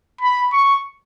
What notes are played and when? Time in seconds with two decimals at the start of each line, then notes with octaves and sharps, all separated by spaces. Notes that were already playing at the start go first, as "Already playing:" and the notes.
0.21 B5
0.53 C#6